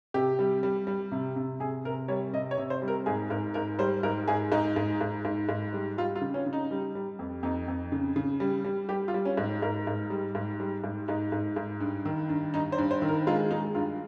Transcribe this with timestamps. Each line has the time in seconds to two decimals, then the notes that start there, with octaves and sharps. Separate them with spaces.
0.14 C3 G4
0.39 G3
0.63 G3
0.87 G3
1.12 C3
1.36 C3
1.60 C3 G#4
1.85 C3 A#4
2.08 G3 C#5
2.33 C3 D#5
2.51 C#5
2.58 C3
2.70 C5
2.82 G3
2.88 A#4
3.06 G#2 G#4
3.30 G#2 A#4
3.54 G#2 A#4
3.79 G3 C5
4.03 G#2 A#4
4.28 G#2 G#4
4.52 G#2 D#4
4.76 G#2
5.01 G#2
5.25 G#2
5.49 G#2
5.73 G3
5.97 G3 F4
6.16 F4
6.21 C#3
6.34 C#4
6.46 C#3
6.53 D#4
6.71 G3
6.95 G3
7.19 F2
7.43 F2 D#4
7.68 F2
7.92 C#3
8.16 C#3
8.40 G3
8.64 G3
8.89 G3 G4
9.08 F4
9.14 G3
9.25 C#4
9.37 G#2
9.62 G#2 A#4
9.87 G#2
10.10 G3
10.35 G#2
10.60 G3
10.84 G#2
11.08 G#2 D#4
11.32 G#2
11.56 G#2
11.80 G2
12.05 D#3
12.29 G2
12.54 G2 D#4
12.72 C5
12.78 G2
12.91 C5
13.02 D#3
13.08 A#4
13.27 G#3 F4
13.51 G#3 D#4
13.75 G2 F4